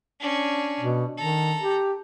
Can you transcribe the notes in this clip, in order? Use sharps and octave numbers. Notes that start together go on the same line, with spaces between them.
C#4 D4
B2
D#3 A4 A#5
G4